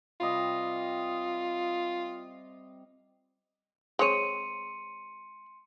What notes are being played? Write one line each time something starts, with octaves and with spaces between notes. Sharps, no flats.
C3 G3 F4 D#5
G#3 C4 C#5 C6 C#7 D#7